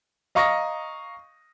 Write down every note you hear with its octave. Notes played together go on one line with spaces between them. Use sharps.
D#5 F5 A#5 C#6 D#6 A#6